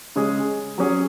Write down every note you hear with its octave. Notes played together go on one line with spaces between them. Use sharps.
C#3 G#3 C#4 G#4
F#3 C#4 G#4